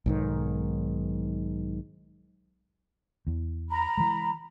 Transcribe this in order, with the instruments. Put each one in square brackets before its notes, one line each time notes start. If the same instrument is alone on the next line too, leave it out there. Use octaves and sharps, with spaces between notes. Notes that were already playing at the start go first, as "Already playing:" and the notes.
[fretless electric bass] B1 G#2 D#3
[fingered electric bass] E2
[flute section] A#5 B5
[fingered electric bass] E3 G#3